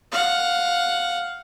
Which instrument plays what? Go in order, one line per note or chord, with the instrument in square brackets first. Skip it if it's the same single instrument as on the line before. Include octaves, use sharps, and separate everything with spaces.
[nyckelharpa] F5 F#5